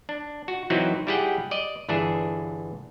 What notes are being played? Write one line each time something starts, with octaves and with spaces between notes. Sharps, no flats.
D4
F#4
E3 F#3 C4 D#4 E4 F#4
G3 E4 G4 G#4 F#5 G5
D5 D#5
G1 E3 D4 G#4 E5